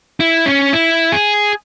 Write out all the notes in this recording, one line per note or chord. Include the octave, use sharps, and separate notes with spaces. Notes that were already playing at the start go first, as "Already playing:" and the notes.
E4
C#4
E4
G#4